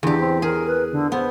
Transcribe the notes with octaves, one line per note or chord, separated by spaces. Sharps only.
E2 D3 G4
C4
G#4 A#4
B4
D3
B3 C5